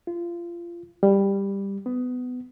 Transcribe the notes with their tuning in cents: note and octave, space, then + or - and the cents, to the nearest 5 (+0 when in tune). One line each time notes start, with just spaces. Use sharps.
F4 -25
G3 +10
B3 +20